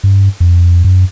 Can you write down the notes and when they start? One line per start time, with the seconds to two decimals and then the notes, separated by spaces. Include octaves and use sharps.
0.04 G2
0.40 F2
0.84 F#2